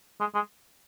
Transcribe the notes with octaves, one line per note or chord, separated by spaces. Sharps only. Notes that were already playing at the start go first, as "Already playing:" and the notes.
G#3
G#3